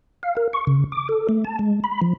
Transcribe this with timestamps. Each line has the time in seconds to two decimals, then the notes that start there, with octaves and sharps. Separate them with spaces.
0.23 F5
0.37 A#4
0.53 C#6
0.67 C#3
0.92 D6
1.09 A4
1.29 A3
1.45 A5
1.59 G#3
1.84 B5
2.02 F3